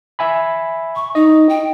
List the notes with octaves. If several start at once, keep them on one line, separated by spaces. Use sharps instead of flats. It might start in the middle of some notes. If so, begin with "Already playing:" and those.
E5 G#5 B5
C#6
D#4 D#5
G5